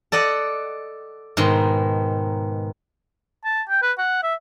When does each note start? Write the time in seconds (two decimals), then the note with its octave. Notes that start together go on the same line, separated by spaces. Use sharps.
0.12 A4 D5 D#5 F#5
1.37 G#2 B2 D#3 C6
3.45 A5
3.69 G5
3.82 B4
3.98 F#5
4.23 E5